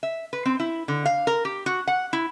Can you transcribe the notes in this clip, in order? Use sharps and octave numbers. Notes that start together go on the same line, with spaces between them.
E5
B4
C4
E4
D3
F5
A#4
G4
F#4
F#5
E4